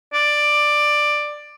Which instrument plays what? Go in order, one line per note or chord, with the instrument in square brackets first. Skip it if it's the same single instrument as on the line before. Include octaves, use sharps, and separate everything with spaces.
[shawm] D5